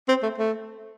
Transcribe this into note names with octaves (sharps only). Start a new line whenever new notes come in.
C4
A3
A3